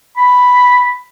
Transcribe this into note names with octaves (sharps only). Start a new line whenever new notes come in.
B5